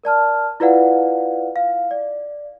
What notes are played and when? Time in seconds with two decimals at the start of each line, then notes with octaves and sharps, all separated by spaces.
0.04 A#4 D5 A5 F6
0.60 E4 F4 B4 D5 F5 F#5
1.56 F5
1.91 D5